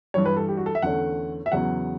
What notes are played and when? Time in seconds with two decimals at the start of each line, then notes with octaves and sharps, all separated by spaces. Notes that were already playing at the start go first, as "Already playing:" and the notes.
0.14 G2 E3 G3 C#5
0.25 B4
0.37 A4
0.49 G4
0.57 F#4
0.66 A4
0.75 E5
0.82 E2 D3 A3 C#4 F#5
1.46 E5
1.52 E2 C#3 F#3 B3 F#5